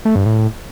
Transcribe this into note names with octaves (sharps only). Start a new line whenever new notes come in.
A3
G2
A2